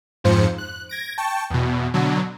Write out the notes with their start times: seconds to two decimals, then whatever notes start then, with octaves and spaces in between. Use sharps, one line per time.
0.24 F2 G#2 F3 C5 C#7
0.58 F#6
0.89 G#6 A#6 D7
1.18 G5 A5 C#6
1.50 E2 B2
1.94 B2 D3 F#3